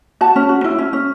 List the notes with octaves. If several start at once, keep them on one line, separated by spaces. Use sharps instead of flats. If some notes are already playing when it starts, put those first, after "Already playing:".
F#4 A5
C#4
F#4
E4
C#4
C#4